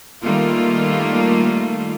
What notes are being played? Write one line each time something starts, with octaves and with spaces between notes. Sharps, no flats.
D#3 G3 A3 A#3 F4